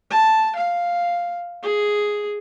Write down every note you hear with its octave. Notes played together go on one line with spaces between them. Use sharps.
A5
F5
G#4